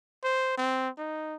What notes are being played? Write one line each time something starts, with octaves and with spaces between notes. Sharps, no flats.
C5
C4
D#4